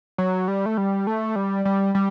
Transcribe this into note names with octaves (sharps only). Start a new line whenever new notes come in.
F#3
G3
A3
G3
A3
G3
G3
G3